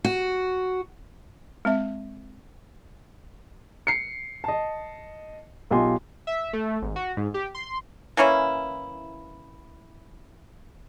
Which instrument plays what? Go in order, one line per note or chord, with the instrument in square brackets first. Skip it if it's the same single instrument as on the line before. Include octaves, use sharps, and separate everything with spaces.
[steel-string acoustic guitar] F#4
[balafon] G#3 C4 E5
[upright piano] C7 C#7
D#5 A5
B1 F4 G4 D#5 G#5 C6
[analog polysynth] E5
A3
G#1
F#4
G#2
G4
C6
[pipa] E3 A#3 C#4 E4